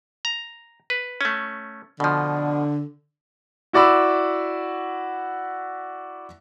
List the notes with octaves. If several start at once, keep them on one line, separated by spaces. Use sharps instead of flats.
A#5
B4
A3 C#4
B2 D3 F3
E4 F#4 D5 B5 E6